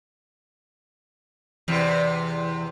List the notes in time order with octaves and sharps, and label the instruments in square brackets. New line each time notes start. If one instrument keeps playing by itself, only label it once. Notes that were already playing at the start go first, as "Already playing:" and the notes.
[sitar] E2 C3 [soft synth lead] E3